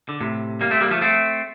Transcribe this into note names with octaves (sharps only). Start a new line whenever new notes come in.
D3
A2 C3
G3 A#3
A3 C4
G3 A#3
F3 A3
A3 C4